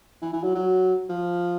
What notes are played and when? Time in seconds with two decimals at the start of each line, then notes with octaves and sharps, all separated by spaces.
0.22 E3
0.33 E3
0.43 F#3
0.55 F#3
1.09 F3